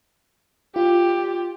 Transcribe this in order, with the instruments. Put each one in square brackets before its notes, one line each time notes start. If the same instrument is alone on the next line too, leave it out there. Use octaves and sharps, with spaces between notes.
[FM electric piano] F4 [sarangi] G4